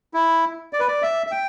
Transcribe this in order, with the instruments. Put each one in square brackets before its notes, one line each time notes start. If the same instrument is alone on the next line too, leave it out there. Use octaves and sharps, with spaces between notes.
[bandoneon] E4
D5
B4
D5
E5
E5
G5